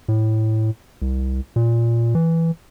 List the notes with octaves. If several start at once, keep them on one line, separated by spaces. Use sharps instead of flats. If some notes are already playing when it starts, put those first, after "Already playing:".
A2
C2
A#2
E3